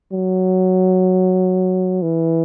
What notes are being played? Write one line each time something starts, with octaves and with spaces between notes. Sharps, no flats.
F#3
E3